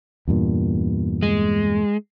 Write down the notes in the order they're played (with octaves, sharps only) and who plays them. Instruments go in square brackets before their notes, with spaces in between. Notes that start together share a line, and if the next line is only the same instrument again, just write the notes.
[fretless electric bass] E2 G2 A#2
[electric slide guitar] G#3